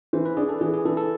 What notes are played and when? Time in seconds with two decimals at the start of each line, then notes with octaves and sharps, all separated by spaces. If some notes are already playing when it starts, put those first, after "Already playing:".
0.13 E3 C5
0.25 B4
0.37 D4 G#4
0.49 A4
0.61 E3 G#4
0.73 G#4
0.85 E3 A4
0.97 A4